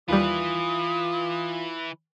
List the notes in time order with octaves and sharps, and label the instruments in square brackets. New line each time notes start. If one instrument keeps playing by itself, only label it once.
[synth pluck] D#2 G3 [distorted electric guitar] E3 B4 [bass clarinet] F4 [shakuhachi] D#6